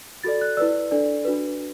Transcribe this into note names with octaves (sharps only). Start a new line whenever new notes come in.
F#4 A4 D5 A6
F#6
E4 B4 D5 E6
D4 A4 D5
D4 F#4 B4